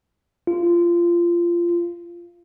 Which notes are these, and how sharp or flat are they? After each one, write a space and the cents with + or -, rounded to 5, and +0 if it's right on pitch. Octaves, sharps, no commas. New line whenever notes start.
F4 -20